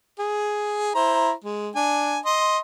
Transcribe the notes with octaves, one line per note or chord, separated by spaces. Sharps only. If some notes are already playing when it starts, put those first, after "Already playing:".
G#4
E4 C5 A#5
G#3
D4 G#5
D#5 C6